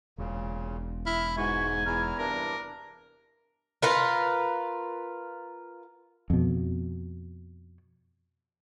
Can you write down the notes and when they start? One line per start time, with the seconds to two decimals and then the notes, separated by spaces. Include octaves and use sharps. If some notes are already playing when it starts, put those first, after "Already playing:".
0.18 E1 A#2 C#3
1.06 E4 E5 F6
1.37 G#2 E3 F#4 G#5 C#6
1.86 E2 E4 A#5 F6
2.19 G2 C3 D4 A#4
3.82 F4 A#4 B4
6.30 F2 B2